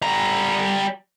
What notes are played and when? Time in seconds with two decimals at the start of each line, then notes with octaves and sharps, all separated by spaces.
0.02 G3 A#5